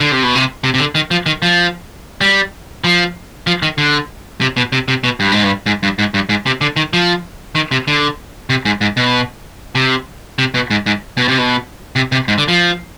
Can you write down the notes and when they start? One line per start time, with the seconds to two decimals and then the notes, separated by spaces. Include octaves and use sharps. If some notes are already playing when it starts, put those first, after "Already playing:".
0.01 D3
0.12 C3
0.23 B2
0.35 C3
0.64 C3
0.74 C3
0.79 D3
0.95 D#3
1.11 F3
1.26 D#3
1.42 F3
2.21 G3
2.84 F3
3.47 F3
3.63 D#3
3.78 D3
4.41 C3
4.57 B2
4.73 C3
4.88 C3
5.04 B2
5.20 G2
5.32 G#2
5.44 G2
5.66 G#2
5.83 G2
5.99 G#2
6.14 G2
6.29 G#2
6.46 C3
6.61 D3
6.76 D#3
6.93 F3
7.55 D#3
7.71 C3
7.88 D3
8.50 C3
8.65 G#2
8.81 G#2
8.97 B2
9.75 C3
10.39 C3
10.54 B2
10.71 G#2
10.86 G#2
11.17 B2
11.28 C3
11.38 B2
11.96 C3
12.12 C3
12.28 G#2
12.38 D3
12.48 F3